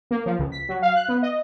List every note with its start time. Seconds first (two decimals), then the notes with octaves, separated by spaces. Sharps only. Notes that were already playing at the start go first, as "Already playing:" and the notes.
0.11 A#3
0.26 F3
0.38 C#2
0.52 B6
0.69 F#3
0.82 F5
0.96 F#6
1.09 B3
1.23 D#5